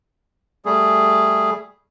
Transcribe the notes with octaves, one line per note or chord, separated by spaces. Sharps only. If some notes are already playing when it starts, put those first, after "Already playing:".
G3 A3 G#4